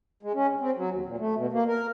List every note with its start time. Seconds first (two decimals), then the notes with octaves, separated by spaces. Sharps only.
0.23 G#3
0.34 C#4
0.48 C#3
0.60 C4
0.76 F#3
0.91 D#2
1.06 A#2
1.19 A3
1.35 B2
1.53 A#3
1.68 A#4